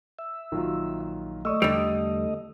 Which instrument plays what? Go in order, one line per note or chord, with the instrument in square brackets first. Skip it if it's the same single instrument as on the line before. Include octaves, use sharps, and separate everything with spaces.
[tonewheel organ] E5
[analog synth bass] A#1 [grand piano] D#3 F#3 F4
[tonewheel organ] A3 D#5 [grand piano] D5 C#6 E6
[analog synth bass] E2 [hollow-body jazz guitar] D3 G3 [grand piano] E6 F7